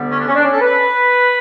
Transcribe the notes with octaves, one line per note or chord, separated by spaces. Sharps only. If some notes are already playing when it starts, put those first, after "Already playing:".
Already playing: D2 D3 G3 B3
C#4
D4
C#4
D4
C#4
A4
B4